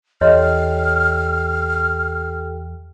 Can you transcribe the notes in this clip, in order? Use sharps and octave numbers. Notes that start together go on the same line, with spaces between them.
E2 G4 A4 C#5 D#5 G5 C6 F6